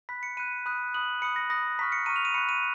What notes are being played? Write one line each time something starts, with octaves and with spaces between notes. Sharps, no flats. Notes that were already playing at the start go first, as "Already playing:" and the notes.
B5 F#6 B6
C#7
B5 F#6 D#7
B5 D#6 F#6
B5 D#6 F#6 F#7
B5 D#6 F#6 C#7
A#6
B5 D#6 F#6 A#6
A#5 C#6 F6 B6
C#7
A#5 C#6 F6 D#7
F7
D#7
B5 F#6 C#7
D#7